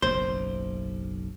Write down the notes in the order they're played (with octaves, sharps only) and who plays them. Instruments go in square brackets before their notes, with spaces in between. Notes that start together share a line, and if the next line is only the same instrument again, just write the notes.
[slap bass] F#1 B1 [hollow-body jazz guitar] C5